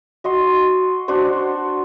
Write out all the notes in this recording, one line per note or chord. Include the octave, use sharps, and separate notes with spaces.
F#4 D#5 C6
D4 F#4 C5